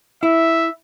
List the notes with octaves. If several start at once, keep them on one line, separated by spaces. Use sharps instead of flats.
E4 E5